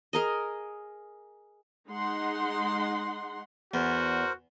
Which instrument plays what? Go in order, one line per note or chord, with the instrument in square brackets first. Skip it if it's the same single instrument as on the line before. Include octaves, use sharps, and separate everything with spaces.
[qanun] G#4 A#4 D#5
[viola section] G#3 D#4 F#5 C6
[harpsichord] E2 [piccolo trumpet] F#4 [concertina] A#4 C5